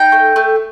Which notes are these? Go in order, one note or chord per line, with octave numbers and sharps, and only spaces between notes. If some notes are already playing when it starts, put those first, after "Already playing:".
Already playing: D#4 G5
A3
A3